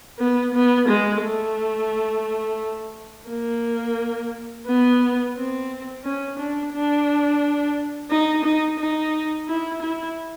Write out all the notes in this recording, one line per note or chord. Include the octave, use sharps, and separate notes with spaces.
B3
B3
G#3
A3
A#3
B3
C4
C#4
D4
D4
D#4
D#4
D#4
E4
E4